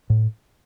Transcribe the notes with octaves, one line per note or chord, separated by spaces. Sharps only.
A2